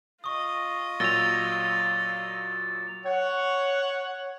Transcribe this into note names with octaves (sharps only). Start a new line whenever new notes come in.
F4 D#5 C#6 D#6
A#2 F#3 E6 A6 A#6 F7 G7
C#5 F#5